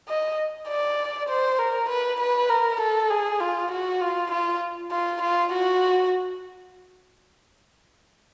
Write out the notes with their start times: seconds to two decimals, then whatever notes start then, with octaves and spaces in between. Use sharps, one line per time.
0.08 D#5
0.68 D5
1.29 C5
1.59 A#4
1.89 B4
2.20 B4
2.49 A#4
2.81 A4
3.10 G#4
3.41 F4
3.71 F#4
4.01 F4
4.31 F4
4.91 F4
5.22 F4
5.53 F#4